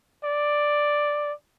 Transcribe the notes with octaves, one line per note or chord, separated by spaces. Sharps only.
D5